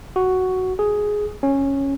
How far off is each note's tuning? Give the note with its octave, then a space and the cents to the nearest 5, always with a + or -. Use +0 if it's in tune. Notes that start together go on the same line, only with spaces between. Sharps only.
F#4 +5
G#4 +5
C#4 -10